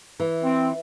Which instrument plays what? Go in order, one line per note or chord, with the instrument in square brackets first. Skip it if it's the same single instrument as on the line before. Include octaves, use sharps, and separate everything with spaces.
[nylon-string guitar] E3
[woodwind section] C4